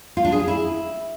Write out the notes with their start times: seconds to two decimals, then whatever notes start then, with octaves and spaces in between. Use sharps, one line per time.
0.17 F4
0.25 D4
0.32 G#4
0.40 C#4
0.48 E4